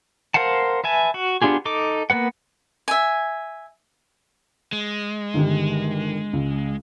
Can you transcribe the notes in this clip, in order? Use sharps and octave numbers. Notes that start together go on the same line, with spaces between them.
A#4 C5 F5 F#5 A5
B4 E5 G#5 A5
F#4
B3 D4 F4 G4 G#4
D#4 A4 D6
A#3 B3 B4 F#5
E5 G#5
G#3
G1 D#3 G4
C#2